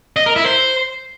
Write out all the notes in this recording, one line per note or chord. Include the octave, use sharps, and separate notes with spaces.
D#5
A#4
E4
C5